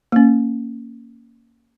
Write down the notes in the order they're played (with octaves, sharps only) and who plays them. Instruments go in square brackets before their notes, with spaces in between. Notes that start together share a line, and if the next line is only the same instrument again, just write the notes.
[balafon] A#3 C#4